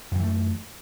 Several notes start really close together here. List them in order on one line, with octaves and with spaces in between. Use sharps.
F#2 D#3 E3 A3